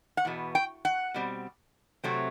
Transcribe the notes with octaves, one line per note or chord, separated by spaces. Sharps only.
F#5
E2 B2 B3
G5
F#5
B2 G3 C4
C3 F#3 A3 C4